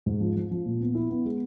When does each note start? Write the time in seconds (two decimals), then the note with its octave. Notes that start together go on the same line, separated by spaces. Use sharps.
0.06 G#2
0.20 F3
0.35 F3
0.51 F3
0.66 A#2
0.80 B3
0.95 E4
1.10 B3
1.25 G#3